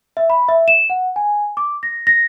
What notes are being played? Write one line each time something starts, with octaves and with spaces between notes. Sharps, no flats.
E5
B5
E5
E7
F#5
G#5
D6
A#6
A#6